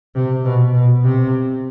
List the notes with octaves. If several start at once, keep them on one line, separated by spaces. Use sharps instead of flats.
C3
B2
B2
C3